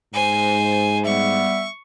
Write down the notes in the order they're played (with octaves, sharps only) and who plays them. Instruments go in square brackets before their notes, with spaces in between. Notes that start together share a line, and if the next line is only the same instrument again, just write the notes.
[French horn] G#2 [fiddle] C5 G#5
[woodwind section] G3 B3 E5 [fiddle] C#6